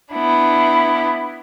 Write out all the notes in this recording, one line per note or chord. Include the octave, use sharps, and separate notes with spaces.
B3 D4 E4